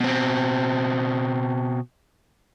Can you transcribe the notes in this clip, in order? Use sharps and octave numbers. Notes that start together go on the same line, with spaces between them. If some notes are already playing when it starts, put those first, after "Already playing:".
B2 C4